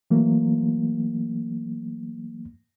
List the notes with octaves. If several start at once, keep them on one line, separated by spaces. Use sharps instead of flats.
E3 F#3 A3 A#3